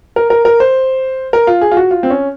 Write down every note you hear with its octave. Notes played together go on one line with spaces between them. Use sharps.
A#4
A#4
A#4
C5
A#4
F4
G#4
F4
F#4
F4
C4
C#4